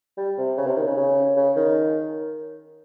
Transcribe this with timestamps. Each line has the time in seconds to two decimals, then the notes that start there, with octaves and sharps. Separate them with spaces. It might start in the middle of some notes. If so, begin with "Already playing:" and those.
0.17 G3
0.38 C3
0.57 C#3
0.66 C3
0.77 D#3
0.86 C#3
0.97 C#3
1.36 C#3
1.56 D#3